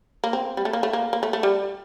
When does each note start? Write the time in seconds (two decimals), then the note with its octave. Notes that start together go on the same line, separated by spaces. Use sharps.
0.24 A#3
0.33 C4
0.57 G3
0.65 A3
0.73 A#3
0.83 A3
0.93 A#3
1.13 A#3
1.23 A3
1.33 A3
1.43 G3